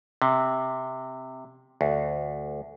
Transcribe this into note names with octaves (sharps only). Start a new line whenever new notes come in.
C3
D2